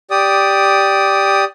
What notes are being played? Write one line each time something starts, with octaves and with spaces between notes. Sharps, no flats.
G4 D5 D#6